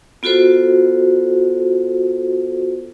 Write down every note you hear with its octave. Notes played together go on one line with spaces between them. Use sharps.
B3 F4 F#4 A4 C5